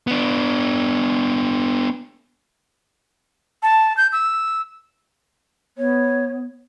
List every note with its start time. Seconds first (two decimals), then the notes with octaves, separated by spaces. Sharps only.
0.07 B3 D4
3.63 A5
3.97 G6
4.12 E6
5.78 B3 C#5